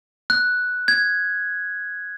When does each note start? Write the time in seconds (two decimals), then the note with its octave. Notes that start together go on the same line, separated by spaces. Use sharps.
0.30 F#6
0.88 G#6